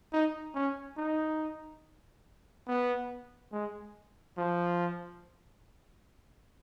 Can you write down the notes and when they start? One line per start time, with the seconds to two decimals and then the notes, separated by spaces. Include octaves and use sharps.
0.13 D#4
0.55 C#4
0.97 D#4
2.67 B3
3.53 G#3
4.38 F3